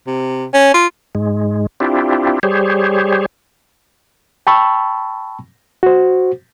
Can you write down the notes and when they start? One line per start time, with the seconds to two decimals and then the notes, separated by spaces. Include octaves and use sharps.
0.07 C3
0.54 C#4
0.74 F4
1.15 G#2 G#3
1.80 C4 D4 E4 F4 G4
2.43 G3 G4 G#4 C5 C#5
4.47 G5 A5 B5 C#6 E6
5.83 F#4 C5